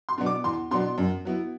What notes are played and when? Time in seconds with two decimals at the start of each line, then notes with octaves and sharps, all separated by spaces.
0.09 C6
0.18 B2 F#3 B3 D4
0.26 D6
0.44 E2 C6
0.71 B2 F#3 B3 D4 C6
0.98 F#2
1.25 F#3 B3 E4